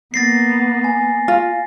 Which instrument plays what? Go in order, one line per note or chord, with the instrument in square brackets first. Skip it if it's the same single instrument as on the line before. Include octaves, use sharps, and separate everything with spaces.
[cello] A#3 B3 [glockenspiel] A6 A#6 C7
[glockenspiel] G#5
[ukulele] F4